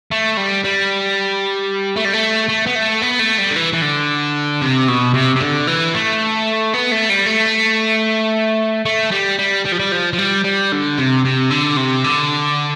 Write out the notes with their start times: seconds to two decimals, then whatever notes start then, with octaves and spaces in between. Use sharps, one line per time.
0.11 A3
0.37 G3
0.64 G3
1.96 A3
2.05 G3
2.13 A3
2.49 A3
2.67 B3
2.75 A3
3.02 B3
3.19 A3
3.38 G3
3.51 D3
3.56 E3
3.73 E3
3.82 D3
4.61 C3
4.88 B2
5.14 C3
5.36 C3
5.41 D3
5.67 E3
5.94 A3
6.74 B3
6.92 A3
7.10 G3
7.26 A3
8.86 A3
9.12 G3
9.39 G3
9.65 G3
9.72 F3
9.80 G3
9.92 F3
10.13 F3
10.19 G3
10.44 G3
10.72 D3
10.98 C3
11.25 C3
11.51 D3
11.77 C3
12.04 D3